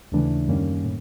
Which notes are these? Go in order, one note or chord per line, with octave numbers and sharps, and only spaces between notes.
D#2 C#3 E3 A3 D4
F#2 D#3 G3 A#3 C#4
A2